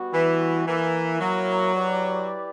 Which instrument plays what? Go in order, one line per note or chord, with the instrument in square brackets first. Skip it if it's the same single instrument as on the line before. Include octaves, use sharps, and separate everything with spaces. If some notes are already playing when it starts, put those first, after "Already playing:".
Already playing: [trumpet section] G3 B3 F#4
[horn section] E3
[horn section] E3 [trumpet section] A#3 E4 A#4
[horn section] F#3
[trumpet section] E4 G4 B4 D5